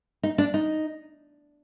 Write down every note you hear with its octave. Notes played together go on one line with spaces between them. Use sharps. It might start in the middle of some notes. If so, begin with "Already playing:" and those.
D#4
D4
D#4